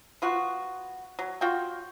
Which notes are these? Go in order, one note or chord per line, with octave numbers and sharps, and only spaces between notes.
B3 F4 F#4
F#3
F4 F#4 G5